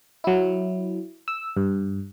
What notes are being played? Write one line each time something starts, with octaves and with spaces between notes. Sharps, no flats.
F#3 E4
E6
G2